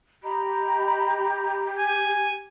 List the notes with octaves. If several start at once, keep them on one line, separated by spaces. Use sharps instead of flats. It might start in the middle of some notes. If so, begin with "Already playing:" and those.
G4 D#5 A#5 B5
G#5